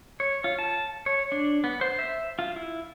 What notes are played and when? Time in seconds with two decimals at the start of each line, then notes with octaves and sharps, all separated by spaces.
0.20 C#5
0.44 F4
0.59 A5
1.06 C#5
1.32 D4
1.64 B3
1.81 C5
1.99 E5
2.39 F4
2.56 E4